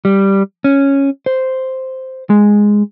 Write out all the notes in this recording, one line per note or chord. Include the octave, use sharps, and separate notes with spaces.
G3
C#4
C5
G#3